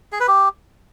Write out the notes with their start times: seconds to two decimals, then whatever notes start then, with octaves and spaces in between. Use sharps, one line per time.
0.12 G#4
0.20 B4
0.28 G4